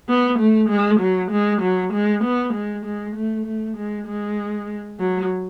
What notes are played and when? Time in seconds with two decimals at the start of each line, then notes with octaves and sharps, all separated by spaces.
0.09 B3
0.39 A3
0.69 G#3
1.00 F#3
1.31 G#3
1.62 F#3
1.93 G#3
2.24 B3
2.54 G#3
2.85 G#3
3.16 A3
3.46 A3
3.77 G#3
4.07 G#3
5.00 F#3